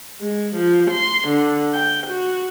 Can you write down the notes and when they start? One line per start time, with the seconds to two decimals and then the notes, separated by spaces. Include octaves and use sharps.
0.22 G#3
0.56 F3
0.91 C6
1.28 D3
1.74 G5
2.07 F#4